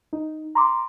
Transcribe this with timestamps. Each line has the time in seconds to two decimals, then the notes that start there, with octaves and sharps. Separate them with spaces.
0.13 D#4
0.55 A#5 C6 D6